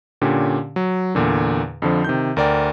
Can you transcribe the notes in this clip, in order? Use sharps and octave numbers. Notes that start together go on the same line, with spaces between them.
A#2 D3 C#4 G4
F#3
E2 A#2 D3
F2 D3 F3
C3 D#3 G6
D2 A#4 D5 G5